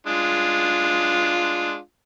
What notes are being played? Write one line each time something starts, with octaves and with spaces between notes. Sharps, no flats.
G#3 D4 F4